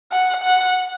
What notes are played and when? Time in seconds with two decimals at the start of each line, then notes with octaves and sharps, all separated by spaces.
0.12 F#5
0.43 F#5